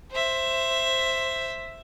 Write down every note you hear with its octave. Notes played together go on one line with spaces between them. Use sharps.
C5 E5